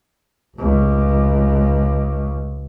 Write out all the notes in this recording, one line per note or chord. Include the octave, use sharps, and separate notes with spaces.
F1 C#2